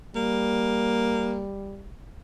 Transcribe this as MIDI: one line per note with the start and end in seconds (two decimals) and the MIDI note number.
0.16 1.85 55
0.16 1.45 58